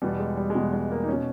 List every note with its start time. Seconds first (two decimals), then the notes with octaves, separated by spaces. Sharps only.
0.02 E2 B2 G3
0.20 G#3
0.37 G3
0.50 G#3
0.55 E2 B2 G3
0.73 G#3
0.91 A#3
1.03 D#4
1.08 B2 C#4